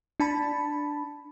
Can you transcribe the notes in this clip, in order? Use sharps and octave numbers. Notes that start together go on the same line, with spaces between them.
D4 A5 B5